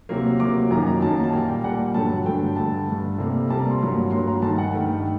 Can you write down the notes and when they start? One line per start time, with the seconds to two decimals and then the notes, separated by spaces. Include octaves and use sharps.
0.09 C3 F#3 A#3
0.40 C3 F#3 A#3 D6
0.71 F#2 D#3 F#3 A#3 A#5
0.87 A#5
1.02 F#2 D#3 F#3 A#3 A5
1.24 A5
1.33 A#2 G3 A#3 G5
1.49 G5
1.64 A#2 G3 A#3 F#5
1.79 G5
1.94 G2 D3 F#3 A3 A5
2.26 G2 D3 F#3 A3 G5
2.56 G2 D3 A3 A5
2.88 G2 D3 A3
3.18 C3 G3 A#3
3.50 C3 G3 A#3 A5
3.60 A#5
3.70 C6
3.81 G2 F#3 A#3
4.11 G2 F#3 A#3 C6
4.27 A#5
4.42 G2 D#3 A3 A5
4.58 F#5
4.73 G2 D#3 A3 G5